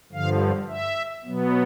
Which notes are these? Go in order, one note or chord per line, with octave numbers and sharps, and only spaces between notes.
G2 D3 F3 F5
E5
B2 F#3 B3